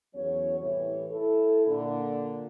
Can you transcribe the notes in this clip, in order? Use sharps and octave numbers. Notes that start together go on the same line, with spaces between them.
E2 F#3 C#4 C#5
C2 A2 E3 C#5
E4 A4
A#2 D3